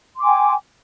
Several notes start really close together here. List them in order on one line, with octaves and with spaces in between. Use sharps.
C6 D6 G#5 G5